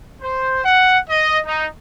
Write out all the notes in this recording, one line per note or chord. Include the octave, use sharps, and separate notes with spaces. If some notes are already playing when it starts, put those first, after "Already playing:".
C5
F#5
D#5
D#4